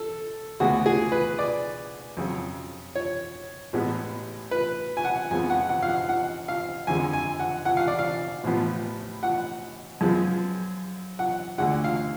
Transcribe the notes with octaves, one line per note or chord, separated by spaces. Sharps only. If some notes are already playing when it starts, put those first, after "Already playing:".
Already playing: A4
D2 C#3 G#3 B3 F#4
G#4
B4
D5
F2 C#3 F#3
C#5
A1 A2 G#3 B3
B4
G#5
F#5
F2 F3 G#3 B3 G#5
F#5
F#5
F5
F#5
F#5
F5
F2 D3 G#3 G#5
G#5
F#5
F#5
F5
D5
F5
A1 A2 F3 B3
F#5
F#2 F3 G#3 B3
F#5
D2 D3 G#3 F#5
F5